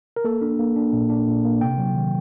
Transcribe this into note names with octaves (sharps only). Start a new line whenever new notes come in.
A#4
A#3 A4
D4
A#3
D4
A#2
D4
A#2
A#3
C3 G5
F#3
D#3